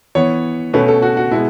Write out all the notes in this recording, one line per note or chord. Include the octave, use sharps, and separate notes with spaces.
E3 B3 C#5
B2 A3 C#4 B4
A4
F#4
F#4
B2 G#3 B3 E4